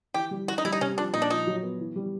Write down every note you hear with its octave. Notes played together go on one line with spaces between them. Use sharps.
E3 G4
G3
E3 F#4
D#4
G3 E4
D#4
C3 C#4
F3 D4
A#2 D#4
D4
F3 D#4
F#3
B3
E3
G3